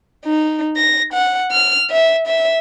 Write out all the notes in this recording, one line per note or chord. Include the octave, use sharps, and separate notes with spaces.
D#4
A#6
F#5
F6
E5
E5